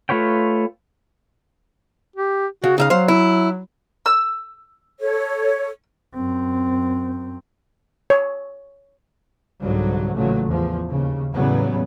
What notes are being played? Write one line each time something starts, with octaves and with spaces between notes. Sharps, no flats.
A3 F4 B4 C#5 G5
G4
C#3 F#4
C#3 D#4 E5 F5
F#3 C5 F5
E4
E6
A4 C#5
F#2 C4
C#5
C2 G#2 D3 F#3 G3
A1 A#2 C#3 F#3 A3
E2 F3
D#2 C#3
E2 A2 C#3 F#3 G3 B3